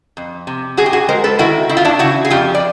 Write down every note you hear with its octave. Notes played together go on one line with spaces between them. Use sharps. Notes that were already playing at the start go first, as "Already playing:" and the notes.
F2
C3
F#2 F#4 G#4
G4
F#4 G#4
G#3 A#4 C5
A4 B4
D#3 E4 F#4
D#3 E4
F4
D4 E4
C#3 E4 F#4
G#4
F2 F4 G4
D5